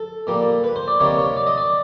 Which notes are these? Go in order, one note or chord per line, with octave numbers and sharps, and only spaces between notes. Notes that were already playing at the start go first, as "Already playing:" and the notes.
Already playing: A4
A#2 G3 A#3
B4
C5
D5
C3 D#3 G3 A#3 C#5
C#5
D5
D#5
D5